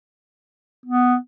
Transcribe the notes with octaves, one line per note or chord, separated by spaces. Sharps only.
B3